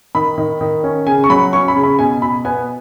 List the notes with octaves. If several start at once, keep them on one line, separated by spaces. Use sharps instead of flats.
D#3 B5
D#3
D#3
C#4
C#3 G#5
C#6
F#3 B5
C#4 C#6
B5
C#3
B5
B2 G#5
B2 B5
B3 G#5